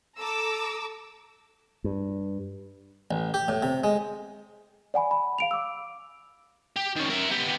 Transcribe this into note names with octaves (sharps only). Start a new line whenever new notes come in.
A4 A#5 D6 E6
G2
A1
G4
A2
C3
G#3
D5 F#5 G#5 B5
B5
F5 D7 F7
D6 E6
G4
D#3 C#4
A#4 E5
B3 G4